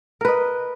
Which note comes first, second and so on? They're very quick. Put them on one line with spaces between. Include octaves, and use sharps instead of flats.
A#4 B4 D#5